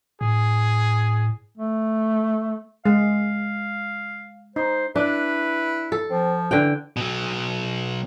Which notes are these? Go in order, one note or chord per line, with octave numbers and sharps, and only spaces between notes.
A2 G#4
A3
G#3 F5
D#4 C5
D4 E4 B4
A4
F3 C4
D3 E3 G5
B2 F#3